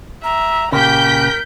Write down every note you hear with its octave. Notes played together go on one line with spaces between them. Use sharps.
E5 A#5
A#2 C#3 G4 A#4 G6 B6